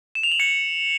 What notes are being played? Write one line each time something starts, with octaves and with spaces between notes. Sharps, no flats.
E7
F7
F#7
C#7